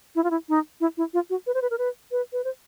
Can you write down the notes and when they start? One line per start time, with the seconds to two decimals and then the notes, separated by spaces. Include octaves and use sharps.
0.15 E4
0.24 F4
0.31 E4
0.49 D#4
0.81 E4
0.97 E4
1.14 F4
1.30 F#4
1.47 B4
1.54 C5
1.62 B4
1.71 A#4
1.78 B4
2.12 B4
2.33 B4
2.44 C5